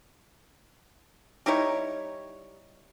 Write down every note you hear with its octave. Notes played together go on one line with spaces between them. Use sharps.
G3 D#4 E4 C#5